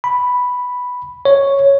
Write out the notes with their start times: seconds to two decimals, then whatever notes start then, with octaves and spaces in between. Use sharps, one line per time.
0.04 B5
1.25 C#5